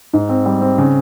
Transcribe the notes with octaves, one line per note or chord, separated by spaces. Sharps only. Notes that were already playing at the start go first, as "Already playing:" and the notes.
G#2
C4
G3
C4
C#3